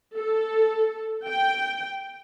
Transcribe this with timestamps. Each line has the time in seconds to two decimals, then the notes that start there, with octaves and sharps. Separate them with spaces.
0.17 A4
1.27 G5